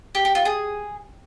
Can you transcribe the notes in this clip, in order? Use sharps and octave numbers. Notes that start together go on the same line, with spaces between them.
G4
G4
F4
G#4